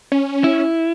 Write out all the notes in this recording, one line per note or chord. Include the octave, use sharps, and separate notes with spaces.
C#4
E4